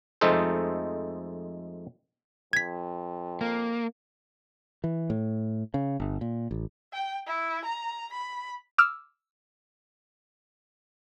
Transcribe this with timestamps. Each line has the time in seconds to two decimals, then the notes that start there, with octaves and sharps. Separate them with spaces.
0.21 F2 G#3 A3 D#4 A4 C5
2.53 F2 G#6 B6
3.41 A#3
4.84 E3
5.10 A2
5.74 C#3
6.00 G1
6.21 A#2
6.51 A1
6.93 G5
7.27 E4
7.65 A#5
8.13 B5
8.78 D6 E6 F6